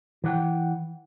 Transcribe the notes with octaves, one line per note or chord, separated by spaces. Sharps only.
E3 F#5 G5